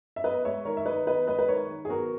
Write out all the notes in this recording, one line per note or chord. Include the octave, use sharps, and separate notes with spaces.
E5
B3 B4 D#5
G#3 C#5 E5
D#3 A#4 C#5
E5
D#3 B4 D#5
B3 B4 D#5
G#3 B4 D#5
B4
D#3 A#4 C#5
D#3
G#4
B3 F#4 A#4